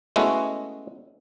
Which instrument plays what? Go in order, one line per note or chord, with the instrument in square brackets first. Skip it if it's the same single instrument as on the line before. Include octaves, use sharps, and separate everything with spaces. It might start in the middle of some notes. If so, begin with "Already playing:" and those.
[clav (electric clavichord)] G#3 A3 B3 C#4 E4 F#4